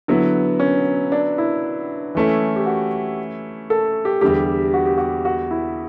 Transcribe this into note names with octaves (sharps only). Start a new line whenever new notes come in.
D3 F#3 B3 E4
C#4
D4
E4
E3 A3 C#4 E4
G4
F#4
A4
G4
E2 D3 G3 G4
F#4
G4
F#4
F#4
E4